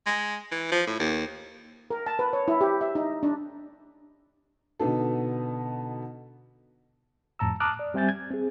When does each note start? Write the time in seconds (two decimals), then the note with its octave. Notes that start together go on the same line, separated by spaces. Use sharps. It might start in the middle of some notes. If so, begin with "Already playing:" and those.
0.06 G#3
0.51 E3
0.71 F3
0.87 A2
0.99 D#2
1.91 A#4
2.06 A5
2.19 B4
2.33 C#5
2.48 E4
2.61 G4
2.81 E5
2.95 D#4
3.23 D4
4.80 B2 D3 B3 D#4 A4
7.39 F2 A2 A5 A#5 E6
7.60 A5 A#5 D6 D#6 F6 F#6
7.79 D5
7.94 G3 C4 E5 G#5 G6 A6
8.09 G#6
8.30 C4 G#4